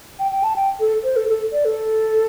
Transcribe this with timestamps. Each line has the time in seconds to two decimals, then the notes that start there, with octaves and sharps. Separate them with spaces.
0.19 G5
0.32 G5
0.43 A5
0.56 G5
0.80 A4
1.04 C5
1.16 A4
1.28 A4
1.52 D5
1.65 A4